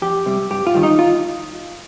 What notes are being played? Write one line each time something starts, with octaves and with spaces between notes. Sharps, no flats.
F2 G4
C3 G3
G2 G4
F4
D#3 G3
D#4
F4